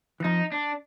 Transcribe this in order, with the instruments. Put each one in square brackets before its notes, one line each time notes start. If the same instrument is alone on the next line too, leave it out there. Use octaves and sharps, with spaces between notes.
[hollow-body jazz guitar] E3
[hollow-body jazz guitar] F2 F3 [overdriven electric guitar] D#4
[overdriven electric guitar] D4